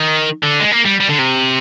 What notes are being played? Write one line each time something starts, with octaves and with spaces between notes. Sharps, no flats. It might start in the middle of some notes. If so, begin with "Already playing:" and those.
Already playing: D#3
D3
G#3
A#3
G3
G3
D3
C3